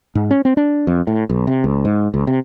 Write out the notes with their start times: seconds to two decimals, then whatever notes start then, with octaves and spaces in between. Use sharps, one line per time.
0.15 G#2
0.31 C#4
0.45 C4
0.57 D4
0.87 F2
1.07 A2
1.29 B1
1.47 C3
1.64 C#2
1.85 G#2
2.14 C#2
2.27 C3